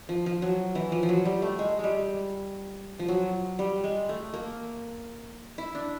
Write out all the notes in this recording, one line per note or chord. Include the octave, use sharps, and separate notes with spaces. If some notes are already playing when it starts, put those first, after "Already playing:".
F3
F3
F#3
E3
F3
F3
F#3
G3
A3
G#3
G3 G#3
F3
F#3
G3
G#3
A3
A#3
E4
D4